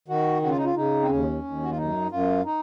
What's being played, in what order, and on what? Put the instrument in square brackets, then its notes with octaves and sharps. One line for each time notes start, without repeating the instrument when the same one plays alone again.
[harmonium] D#3 F#4
C#3 F#4
F4
D#4
F4
C#3 D#4
C4
D#2 C#4
D#2
F#4
F4
F#2 D#4
F#2 F4
D#4